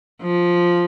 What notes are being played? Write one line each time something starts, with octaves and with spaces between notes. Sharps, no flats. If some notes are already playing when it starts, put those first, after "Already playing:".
F3